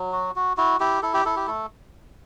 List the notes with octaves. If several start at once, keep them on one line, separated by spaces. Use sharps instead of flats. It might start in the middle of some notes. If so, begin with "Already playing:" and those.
Already playing: F#3
F#4
F#4
E4 F#4
E4 G4
E4 A4
G4
E4 A4
G4
A3 A4